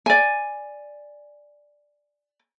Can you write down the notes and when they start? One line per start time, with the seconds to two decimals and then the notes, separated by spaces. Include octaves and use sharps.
0.06 D5 G#5